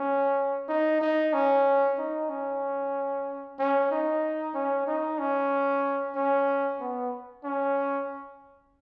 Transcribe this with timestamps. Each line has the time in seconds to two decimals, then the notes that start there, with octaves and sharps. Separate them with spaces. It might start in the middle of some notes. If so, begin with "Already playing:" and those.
Already playing: C#4
0.69 D#4
1.01 D#4
1.33 C#4
1.98 D#4
2.29 C#4
3.59 C#4
3.91 D#4
4.54 C#4
4.87 D#4
5.19 C#4
6.15 C#4
6.80 B3
7.44 C#4